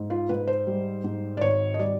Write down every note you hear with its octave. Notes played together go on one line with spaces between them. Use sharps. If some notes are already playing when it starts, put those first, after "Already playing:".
Already playing: G#2
F4
G#2 B4
C5
G3
G#2
D5
G#1 C#5
D#5
G3 D5